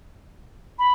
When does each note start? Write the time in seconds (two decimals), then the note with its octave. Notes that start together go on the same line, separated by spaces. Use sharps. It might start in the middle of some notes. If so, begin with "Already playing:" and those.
0.79 B5